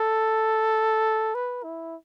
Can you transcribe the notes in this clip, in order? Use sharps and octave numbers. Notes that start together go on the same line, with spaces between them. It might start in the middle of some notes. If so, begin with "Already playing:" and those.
Already playing: A4
B4
E4